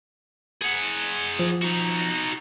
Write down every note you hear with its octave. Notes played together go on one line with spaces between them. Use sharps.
G#4 F#5
F3
D#4 F#4